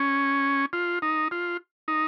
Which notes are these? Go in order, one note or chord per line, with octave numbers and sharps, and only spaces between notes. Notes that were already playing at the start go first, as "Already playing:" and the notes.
Already playing: C#4
F4
D#4
F4
D#4